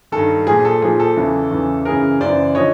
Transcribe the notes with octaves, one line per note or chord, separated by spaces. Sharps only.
G2 D#3 A4
A#2 F3 G#4
A4
A#2 F3 G#4
A4
E2 C#3 E3
E2 C#3 E3
F#2 C#3 E3 G#4 A#4
F#2 C#3 E3 C5 D5
D3 F3 C#5 D#5